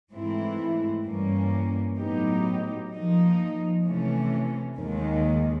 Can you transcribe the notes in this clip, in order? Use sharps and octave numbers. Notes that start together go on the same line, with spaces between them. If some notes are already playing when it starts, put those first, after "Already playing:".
G#2 E3 A3 C4 E4
G2 E3 G3 A#3 C#4
A2 F#3 B3 D#4 G4
F3 A#3 D#4
C3 E3 A3 C#4
D#2 D#3 G#3